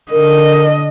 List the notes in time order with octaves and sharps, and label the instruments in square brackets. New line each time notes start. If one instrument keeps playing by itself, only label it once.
[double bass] D3 [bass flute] A#4 [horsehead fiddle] D#5